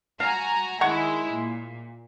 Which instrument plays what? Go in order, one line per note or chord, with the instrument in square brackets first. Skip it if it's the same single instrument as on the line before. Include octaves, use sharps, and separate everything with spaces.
[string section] F#4 G#5 A#5 [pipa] F5
[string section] D#3 G#3 E4 [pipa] C#5 F#5 C#6
[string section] A#2